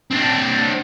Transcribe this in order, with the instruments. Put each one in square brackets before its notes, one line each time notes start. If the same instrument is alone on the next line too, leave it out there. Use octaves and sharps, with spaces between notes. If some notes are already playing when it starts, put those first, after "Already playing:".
[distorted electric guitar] C4 D4